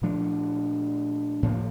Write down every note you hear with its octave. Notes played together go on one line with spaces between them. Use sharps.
A#2 F3 A3 D4
A2 F3 A#3